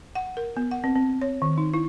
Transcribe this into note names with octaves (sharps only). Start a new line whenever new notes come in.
F#5
A#4
B3
F#5
C4
C4
C#5
D#3
D#4
E4